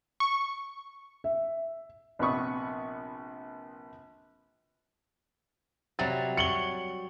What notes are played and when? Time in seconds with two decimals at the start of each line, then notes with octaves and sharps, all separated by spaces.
0.20 C#6
1.24 E5
2.19 A#1 C3 B3 B5 C#6 D#6
5.99 C3 F#3 G3 A6
6.37 C#5 C#7 F#7 G7